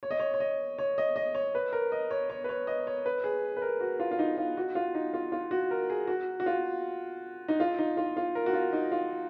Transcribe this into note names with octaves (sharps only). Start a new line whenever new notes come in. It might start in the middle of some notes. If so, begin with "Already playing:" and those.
C#5
D#5
C#5
C#5
D#5
C#5
D#5
D#5
C#5
B4
A#4
D#5
C#5
C#5
B4
C#5
D#5
C#5
B4
G#4
B4
A#4
F#4
F4
F4
D#4
F4
F#4
F4
D#4
F4
F4
F#4
A#4
G#4
F#4
F#4
F4
D#4
F4
D#4
F4
F4
A#4
F#4
F4
D#4
F4